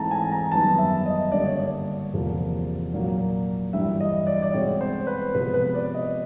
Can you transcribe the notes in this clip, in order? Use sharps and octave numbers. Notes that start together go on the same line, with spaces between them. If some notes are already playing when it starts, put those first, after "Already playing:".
Already playing: G#2 E3 A3 C4 A5 A#5
G#5
A#5
F#2 D#3 G3 B3 A5
E5
D#5
G2 D3 G3 A#3 D5
C#5
D5
E2 C3 F3 A#3
A#2 F#3 A#3
G2 E3 G3 E5
D#5
D5
D5
B2 G#3 C4 C#5
C5
B4
C3 F3 G#3 B3 B4
B4
D5
D#5